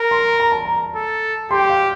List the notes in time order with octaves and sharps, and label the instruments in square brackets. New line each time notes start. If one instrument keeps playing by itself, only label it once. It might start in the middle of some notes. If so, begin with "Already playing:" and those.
Already playing: [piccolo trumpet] A#4 [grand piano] A#5
[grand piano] C6
A#5
A5
A#5
[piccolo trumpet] A4
[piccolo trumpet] G4 [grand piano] C6
[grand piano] F5